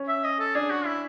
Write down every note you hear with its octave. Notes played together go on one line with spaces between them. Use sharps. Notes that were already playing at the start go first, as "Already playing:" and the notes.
Already playing: C#4
E5
D#5
A4
D4 G#4
F#4
E4